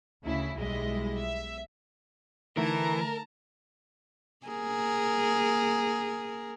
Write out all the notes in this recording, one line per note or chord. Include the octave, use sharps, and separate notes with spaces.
D2 C#3 E4
B1 G3 G#3 E4 D#5
E5
D3 E3 A3 D#4 A#4 A5 A#5
A#3 G#4 A#4